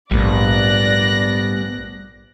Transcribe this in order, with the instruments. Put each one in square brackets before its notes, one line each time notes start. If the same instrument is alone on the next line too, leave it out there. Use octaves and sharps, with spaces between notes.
[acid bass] A#1 [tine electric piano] G#2 A3 [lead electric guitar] G3 B3 [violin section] D5 F#6 A#6